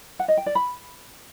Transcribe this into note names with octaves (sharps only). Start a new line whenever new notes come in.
F#5
D#5
G5
D5
B5